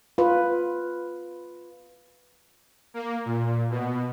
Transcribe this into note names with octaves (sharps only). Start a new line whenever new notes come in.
F4 B4
A#3
A#2
B2